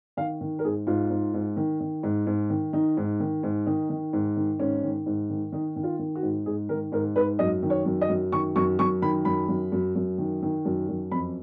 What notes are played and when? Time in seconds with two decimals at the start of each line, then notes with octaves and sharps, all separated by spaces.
0.17 D#3 F5
0.41 D#3
0.59 A#4
0.64 G#2 G#4
0.87 G#2 F4
1.10 G#2
1.34 G#2
1.57 D#3
1.80 D#3
2.03 G#2
2.27 G#2
2.50 D#3
2.73 D#3 D#4
2.97 G#2
3.20 D#3
3.43 G#2
3.66 D#3 D#4
3.89 D#3
4.13 G#2
4.37 D#3
4.59 G#2 C#4
4.83 D#3
5.06 G#2
5.30 D#3
5.52 D#3 D#4
5.76 D#3
5.83 F4
5.99 D#3
6.15 F#4
6.23 G#2
6.46 G#2 G#4
6.69 D#3 A#4
6.92 G#2 A#4
7.16 G#2 B4
7.39 F#2 D#5
7.63 D#3
7.70 C#5
7.85 F#2
8.01 D#5
8.09 F#2
8.32 D#3 C#6
8.56 F#2 C#6
8.79 F#2 C#6
9.02 D#3 B5
9.25 F#2 B5
9.48 F#2
9.72 F#2
9.95 F#2
10.18 D#3
10.42 D#3
10.65 F#2
10.88 F#2
11.11 F2 B5